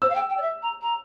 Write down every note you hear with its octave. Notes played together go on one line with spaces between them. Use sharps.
C5 E6
F5
G5
G5
D5
E5
A#5
A#5